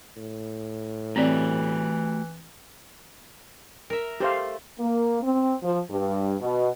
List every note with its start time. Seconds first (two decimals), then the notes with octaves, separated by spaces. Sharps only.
0.16 A2
1.16 E3 A3 C4 F#4 G4 D5
3.90 A#4 E5
4.20 A3 G4 C5 F5
4.80 A#3
5.23 C4
5.63 F3
5.91 G2
6.41 B2